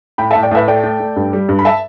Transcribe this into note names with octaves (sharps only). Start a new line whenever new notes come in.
A2 G5 B5
E5 A5
A2
D5 G5
A2 B4 E5
A3 D5 G5
A3
A3
G2
G3
G2
B5
E5 A5